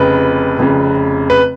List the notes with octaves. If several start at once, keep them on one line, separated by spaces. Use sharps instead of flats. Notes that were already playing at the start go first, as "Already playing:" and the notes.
Already playing: F1 F2 C#3 B4
F1 F2 C#3
B4